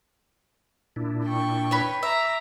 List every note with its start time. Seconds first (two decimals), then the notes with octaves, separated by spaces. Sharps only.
0.96 A#2 D4 E4
1.25 G5 C#6
1.71 B4 C#5
2.03 E5 A#5 D6